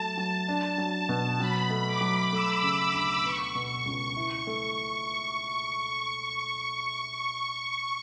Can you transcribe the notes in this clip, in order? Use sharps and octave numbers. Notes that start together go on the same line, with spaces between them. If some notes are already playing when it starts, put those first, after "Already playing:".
Already playing: F#3 A3 A5
F#3
D4 A5
F#3 A5
B2 A5
F#3 B5
A3
D6
F#3
A3 E6
C#3
D6
D2
B3 C#6
B2
C#2
E4
A3